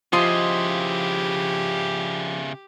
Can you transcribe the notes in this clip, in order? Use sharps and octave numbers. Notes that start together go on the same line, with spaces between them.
C#3 F3 E4 F4 G4 D#5 C6